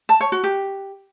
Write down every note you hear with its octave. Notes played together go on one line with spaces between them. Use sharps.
A5
C#5
F#4
G4